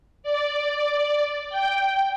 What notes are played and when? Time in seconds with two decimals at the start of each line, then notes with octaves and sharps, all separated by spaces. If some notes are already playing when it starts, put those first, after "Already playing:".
0.23 D5
1.49 G5